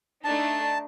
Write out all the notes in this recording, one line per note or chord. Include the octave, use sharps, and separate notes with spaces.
A3 D4 D#4 A5